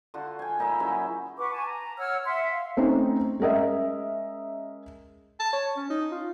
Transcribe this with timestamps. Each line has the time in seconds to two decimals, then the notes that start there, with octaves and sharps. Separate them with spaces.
0.14 D3 F4 F#4
0.39 G5 G#5
0.59 A#2 D#4 E5 B5
0.79 C#3 F#3 E4
1.38 B4 F#5 C#6 D6
1.52 G#5 A5
1.65 A#5
1.98 C#5 F#5 E6 F6
2.25 E5 F#5 C6
2.51 F5
2.77 A3 C4 C#4 D#4
3.40 G#3 C#4 A#4 D#5 E5
5.40 A5
5.53 C#5
5.76 C#4
5.90 D#4
6.11 F4